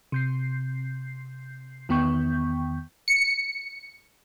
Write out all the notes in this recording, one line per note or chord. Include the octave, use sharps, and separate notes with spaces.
C3 G6 C7
E2 D#3 B3 G5 C#6 G6
C#7